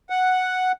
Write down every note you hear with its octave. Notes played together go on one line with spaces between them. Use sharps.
F#5